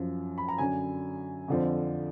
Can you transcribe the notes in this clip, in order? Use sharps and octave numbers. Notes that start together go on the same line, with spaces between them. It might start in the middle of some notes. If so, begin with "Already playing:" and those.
Already playing: F#2 F3
B5
A#5
F#2 D3 F#3 G#5
F2 D3 F3